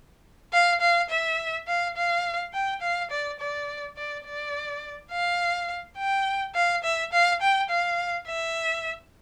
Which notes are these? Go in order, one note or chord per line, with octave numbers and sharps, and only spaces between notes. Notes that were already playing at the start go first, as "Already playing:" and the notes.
F5
F5
E5
F5
F5
G5
F5
D5
D5
D5
D5
F5
G5
F5
E5
F5
G5
F5
E5